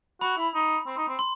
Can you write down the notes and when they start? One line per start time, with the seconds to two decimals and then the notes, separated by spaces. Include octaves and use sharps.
0.21 F#4 B5
0.37 E4
0.55 D#4
0.86 C4
0.97 D#4
1.08 C4
1.19 C6